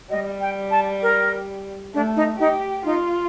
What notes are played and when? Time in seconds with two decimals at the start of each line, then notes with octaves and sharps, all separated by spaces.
0.10 G3 D#5
0.41 G5
0.71 A5
1.03 A#4
1.94 A3 D4
2.16 D#4
2.39 D#4 G4
2.85 D#4 F4